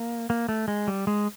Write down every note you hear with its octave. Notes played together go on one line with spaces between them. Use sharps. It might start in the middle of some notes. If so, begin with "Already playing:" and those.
Already playing: A#3
A#3
A3
G#3
G3
G#3